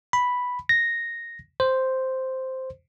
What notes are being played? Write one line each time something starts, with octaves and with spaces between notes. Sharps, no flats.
B5
A#6
C5